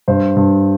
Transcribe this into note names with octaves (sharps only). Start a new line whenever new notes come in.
G2 C5
G2